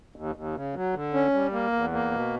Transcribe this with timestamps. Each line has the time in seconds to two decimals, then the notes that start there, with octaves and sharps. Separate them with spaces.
0.16 D#2
0.35 D#2
0.55 C#3
0.75 F#3
0.94 D3
1.14 C#4
1.33 G3
1.53 A#3
1.72 E2
1.92 A#3
2.11 B2